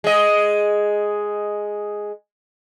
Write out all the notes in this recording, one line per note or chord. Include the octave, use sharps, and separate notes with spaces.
G#3 D#5